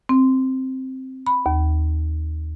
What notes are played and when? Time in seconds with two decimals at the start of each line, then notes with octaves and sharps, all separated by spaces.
0.09 C4
1.27 B5
1.46 D#2